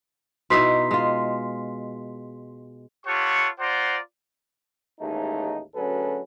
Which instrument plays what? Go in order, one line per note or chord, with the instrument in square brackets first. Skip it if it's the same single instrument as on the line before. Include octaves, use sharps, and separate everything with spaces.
[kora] B2 D#4 E4 [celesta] C6 B6 C7
[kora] G#3 F4
[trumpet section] F4 G4 A4 C#5 F#5 C#6
F4 C5 D5 F#5 A#5 C6
[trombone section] A1 D#2 G#3 A3 D#4
D2 F#3 C#4 G#4 A4 B4